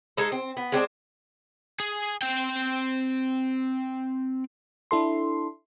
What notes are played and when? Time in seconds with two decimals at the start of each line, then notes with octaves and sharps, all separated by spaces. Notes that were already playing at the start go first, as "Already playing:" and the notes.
0.17 G#3 D#4 A4
0.32 C4
0.57 B3
0.72 G#3 C4 D4
1.80 G#4
2.22 C4 G5
4.91 D4 E4 A4 C6